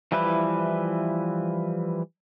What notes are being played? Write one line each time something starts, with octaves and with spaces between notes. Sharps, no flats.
E3 F3 G3 E4 B4